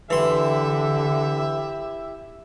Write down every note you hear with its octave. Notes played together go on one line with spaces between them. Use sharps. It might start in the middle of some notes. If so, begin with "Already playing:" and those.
D3 E3 E4 G4 E5 C6